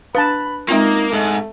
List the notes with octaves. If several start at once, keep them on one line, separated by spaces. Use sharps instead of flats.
D4 B4 F5 A5 B5
G#3 A#3 C4 D#4 F4
G#2 A3